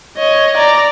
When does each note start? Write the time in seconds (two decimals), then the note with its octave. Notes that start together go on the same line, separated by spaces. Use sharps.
0.17 C#5 D#5
0.56 D5 A#5